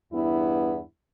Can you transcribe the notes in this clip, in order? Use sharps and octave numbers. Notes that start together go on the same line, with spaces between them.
E2 G2 B3 E4